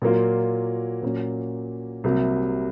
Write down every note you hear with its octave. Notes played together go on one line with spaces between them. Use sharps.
A#2 F#3 A#3 F4
A#2 F#3 A#3 C#4
C2 C3 F#3 A#3